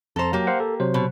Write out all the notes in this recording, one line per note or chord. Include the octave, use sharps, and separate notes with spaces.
F2 A4 C5 A#5
F#3 A#3 G4
C5 F5 F#5
A4
C3 F#3 C5
B2